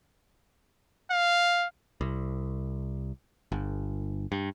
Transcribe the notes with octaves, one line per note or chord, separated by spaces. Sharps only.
F5
C2
G1
G2